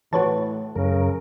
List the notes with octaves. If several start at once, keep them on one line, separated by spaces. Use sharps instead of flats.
A2 E3 F#4 B4 C#5 A5
F#2 C#3 A#4